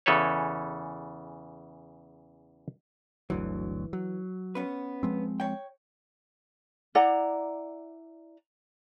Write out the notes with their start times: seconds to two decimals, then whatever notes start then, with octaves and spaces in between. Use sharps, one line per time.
0.06 E2 C#3 E3 A4 B4 C#5
3.30 G1 D2 E3 F#3
3.93 F#3
4.55 B3 C#4 B4
5.03 F3 G#3 C4
5.40 C#5 G5
6.95 E4 D5 F#5 A#5